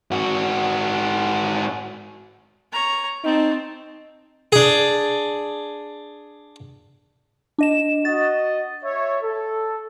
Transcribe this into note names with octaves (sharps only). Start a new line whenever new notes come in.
G#2 F#4
C#5 A#5
C4 D#4 A5
D4 G#4
D4 D#5 E7
F#4 D#5 A6
C#5 E5
A4